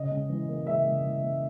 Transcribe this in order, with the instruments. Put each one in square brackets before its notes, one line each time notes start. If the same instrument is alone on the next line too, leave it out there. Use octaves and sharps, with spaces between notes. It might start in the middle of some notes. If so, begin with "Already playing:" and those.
Already playing: [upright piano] C#3 D#5
C#3
E3
A#3
C#3 E5
C#3
E3
A#3